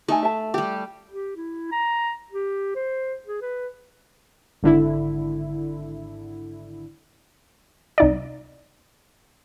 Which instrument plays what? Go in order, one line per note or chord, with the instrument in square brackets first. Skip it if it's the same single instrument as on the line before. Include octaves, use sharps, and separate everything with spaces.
[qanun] A3 [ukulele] D#4 A4 G#5
[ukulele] E5 A5
[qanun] G3 G4
[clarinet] G4
E4
A#5
G4
C5
G#4
B4
[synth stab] G#1 D3 E4
[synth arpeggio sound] C2 D#4 D5